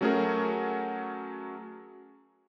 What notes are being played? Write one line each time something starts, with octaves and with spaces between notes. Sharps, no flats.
F#3 A3 C#4 F#4 G#4 A#4